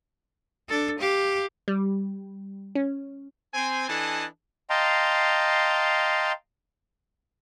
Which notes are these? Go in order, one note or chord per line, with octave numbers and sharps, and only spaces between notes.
D4 A4
G4 F5
G3
C#4
C4 G#5
E3 D4 A4 D#5 G#5 A5
D#5 F5 G5 A5 A#5 C6